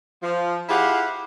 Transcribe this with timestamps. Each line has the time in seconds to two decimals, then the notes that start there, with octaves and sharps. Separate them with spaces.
0.22 F3
0.69 E4 F4 G4 G#4 F5 F#5